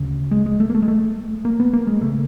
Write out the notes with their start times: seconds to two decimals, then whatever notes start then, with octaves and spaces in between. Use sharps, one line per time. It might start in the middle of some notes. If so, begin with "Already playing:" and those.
Already playing: D2 C#3
0.31 G#3
0.46 G#3
0.60 A3
0.70 A#3
0.75 A3
0.82 G#3
0.88 A3
1.45 A#3
1.60 B3
1.73 A#3
1.87 G#3
2.01 C#3 A3